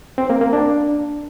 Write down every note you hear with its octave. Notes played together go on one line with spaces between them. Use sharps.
C4
A#3
A#3
D4